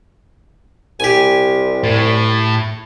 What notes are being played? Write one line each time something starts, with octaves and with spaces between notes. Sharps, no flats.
C2 G4 G#5
A2